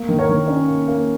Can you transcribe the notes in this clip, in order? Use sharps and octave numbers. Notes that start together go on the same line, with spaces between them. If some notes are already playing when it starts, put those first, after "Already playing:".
Already playing: A#3
D#3
A#4 C#5
D#3
C#4
A#3
A#3